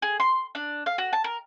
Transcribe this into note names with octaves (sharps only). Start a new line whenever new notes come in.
G#4
C6
D4
F5
F#4
A5
A#4